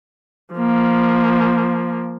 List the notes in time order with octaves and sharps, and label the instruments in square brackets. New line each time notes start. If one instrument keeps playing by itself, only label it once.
[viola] F3 A#3